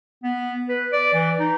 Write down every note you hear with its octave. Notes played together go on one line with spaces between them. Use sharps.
B3
B4
D5
E3
D#4